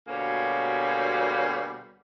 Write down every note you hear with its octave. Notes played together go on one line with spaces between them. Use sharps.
D2 B2 G3 A#3 G#4 C#5